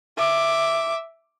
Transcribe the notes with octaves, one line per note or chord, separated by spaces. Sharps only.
E5 D6